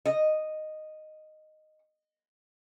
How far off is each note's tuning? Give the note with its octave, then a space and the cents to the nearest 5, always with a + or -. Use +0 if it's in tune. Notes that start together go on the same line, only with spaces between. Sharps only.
D#5 -5